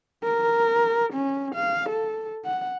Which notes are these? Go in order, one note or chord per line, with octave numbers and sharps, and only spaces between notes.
A#4
C#4
F5
A4
F#5